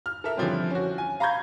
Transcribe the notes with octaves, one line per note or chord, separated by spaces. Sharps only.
F6
A4 A#4 E5 F6
D3 E3 F3 G3 C4 C#4
C#4 F#4
G#5
F5 A#5 B5 C#6 G6 G#6